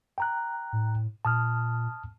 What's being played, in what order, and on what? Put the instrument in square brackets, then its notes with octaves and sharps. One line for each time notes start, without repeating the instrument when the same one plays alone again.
[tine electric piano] G5 A#5 F#6
[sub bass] A2
[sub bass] A#2 [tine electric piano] A5 D#6 F6